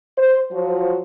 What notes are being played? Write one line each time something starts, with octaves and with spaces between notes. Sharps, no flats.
C5
F3 F#3 F4 F#4 C5